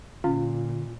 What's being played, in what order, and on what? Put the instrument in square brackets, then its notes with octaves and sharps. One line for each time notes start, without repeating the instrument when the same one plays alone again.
[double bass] A#2 [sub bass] D3 [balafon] C#4 [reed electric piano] F4